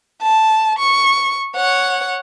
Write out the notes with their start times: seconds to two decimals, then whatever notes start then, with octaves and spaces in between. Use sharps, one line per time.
0.22 A5
0.79 C#6
1.56 C#5 F#5